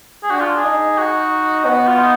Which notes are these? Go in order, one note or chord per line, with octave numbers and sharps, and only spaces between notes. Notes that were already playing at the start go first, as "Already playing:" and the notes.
G#4
D4 F#4
F4
G#4
D#4
F#4
B3 F#4
F4
D#4